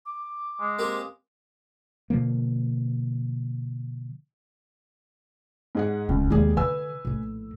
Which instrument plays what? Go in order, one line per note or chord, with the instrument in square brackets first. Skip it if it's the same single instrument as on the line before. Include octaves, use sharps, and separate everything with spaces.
[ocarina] D6
[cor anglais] G#3
[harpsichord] A#3 C4 G4
[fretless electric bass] B2 D3 F3 A#3
[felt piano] G#2 G#4 F#5
[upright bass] D1 C4 [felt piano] C#2
[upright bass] D#2 G#3 [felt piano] G3 G#4
[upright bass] D3 [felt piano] B4 G#5 E6
[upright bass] A#1 A2